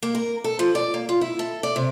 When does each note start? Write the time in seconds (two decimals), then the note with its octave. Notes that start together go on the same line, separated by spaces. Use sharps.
0.03 A#3
0.15 A#4
0.44 A4
0.59 F3
0.75 D5
0.94 A#3
1.09 F4
1.21 E4
1.39 A4
1.63 D5
1.76 C3